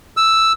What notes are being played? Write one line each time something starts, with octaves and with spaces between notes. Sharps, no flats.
E6